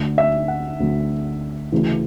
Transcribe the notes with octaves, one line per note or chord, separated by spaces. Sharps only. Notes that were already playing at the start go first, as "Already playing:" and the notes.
Already playing: D2 D3
E5
F#5
D2 D3
D2 C#3 E3